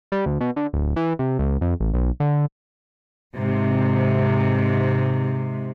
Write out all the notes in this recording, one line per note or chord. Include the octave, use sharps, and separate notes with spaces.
G3
D2
B2
D3
D1
E3
C3
C#2
F2
A1
B1
D3
G#2 C3